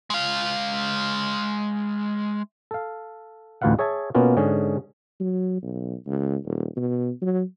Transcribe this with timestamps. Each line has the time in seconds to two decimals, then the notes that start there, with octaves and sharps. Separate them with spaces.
0.10 G#3 F5
2.71 A4 F5
3.62 A1 D2 F4 B4 F5 F#5
3.79 G#4 C#5 E5 G#5 A5
4.15 B2 A#3 B3 C#4 F4
4.37 G#2 D3 C#4 G#4
5.20 F#3
5.63 B1
6.06 C#2
6.45 D#1
6.77 B2
7.22 F#3